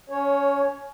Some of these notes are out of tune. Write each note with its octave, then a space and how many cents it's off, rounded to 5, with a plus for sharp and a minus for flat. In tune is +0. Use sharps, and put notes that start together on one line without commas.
C#4 +20 C#5 +0